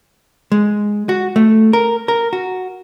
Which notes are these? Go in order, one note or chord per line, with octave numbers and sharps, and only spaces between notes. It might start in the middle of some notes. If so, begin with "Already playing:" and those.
G#3
F#4
A3
A#4
A#4
F#4